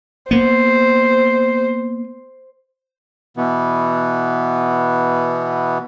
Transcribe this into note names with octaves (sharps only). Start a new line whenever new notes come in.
A#3 B3 C5
B2 E3 B3